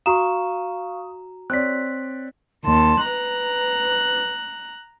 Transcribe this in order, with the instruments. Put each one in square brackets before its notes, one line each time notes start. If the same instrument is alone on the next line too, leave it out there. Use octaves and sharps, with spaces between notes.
[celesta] F#4 A#5 E7 [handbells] F5 C#6 [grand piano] D#6
[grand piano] C4 C#5 D5 [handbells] F#6 B6
[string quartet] D#2 A5 [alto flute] C6
[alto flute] B4 [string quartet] A#5 F#6